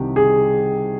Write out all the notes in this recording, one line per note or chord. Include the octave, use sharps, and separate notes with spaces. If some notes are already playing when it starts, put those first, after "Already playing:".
Already playing: C2 C3 D#3 G4
G#4